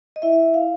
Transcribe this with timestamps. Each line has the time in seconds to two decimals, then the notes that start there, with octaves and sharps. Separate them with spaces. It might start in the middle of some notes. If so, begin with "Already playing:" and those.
0.16 D#5
0.22 E4 E5
0.54 F5